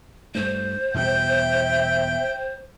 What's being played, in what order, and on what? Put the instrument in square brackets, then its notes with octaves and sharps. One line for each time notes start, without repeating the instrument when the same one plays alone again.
[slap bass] G2 A3 [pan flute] C5
[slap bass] E2 B2 G3 [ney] E5 [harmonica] G5